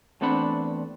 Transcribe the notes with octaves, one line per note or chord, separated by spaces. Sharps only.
E2 A3 C4 D4 F#5 B5